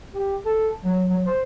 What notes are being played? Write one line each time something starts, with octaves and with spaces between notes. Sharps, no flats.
G4
A4
F#3
F#3
C5